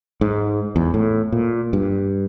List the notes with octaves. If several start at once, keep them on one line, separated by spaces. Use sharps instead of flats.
G#2
E2
A2
A#2
G2